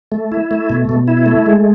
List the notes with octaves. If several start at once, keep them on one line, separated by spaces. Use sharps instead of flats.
A3
E4
A3
B2
B2
E4
A3
G#3